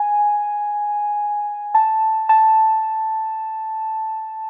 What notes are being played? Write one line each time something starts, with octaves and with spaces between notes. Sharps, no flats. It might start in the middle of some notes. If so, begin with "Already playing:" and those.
Already playing: G#5
A5
A5